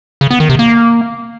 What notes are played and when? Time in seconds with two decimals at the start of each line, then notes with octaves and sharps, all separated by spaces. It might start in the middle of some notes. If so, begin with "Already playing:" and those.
0.21 C#3
0.31 B3
0.40 D#3
0.50 C3
0.59 A#3